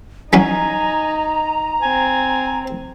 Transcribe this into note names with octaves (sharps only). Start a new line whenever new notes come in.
E3 F#3 C#4 D#4 G#5 A#5
C4 G#5